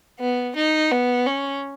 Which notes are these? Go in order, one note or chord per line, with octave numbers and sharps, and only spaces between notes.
B3
D#4
B3
C#4